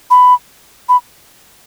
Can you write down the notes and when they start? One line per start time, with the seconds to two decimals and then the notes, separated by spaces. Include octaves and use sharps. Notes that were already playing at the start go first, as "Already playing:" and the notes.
0.10 B5
0.89 B5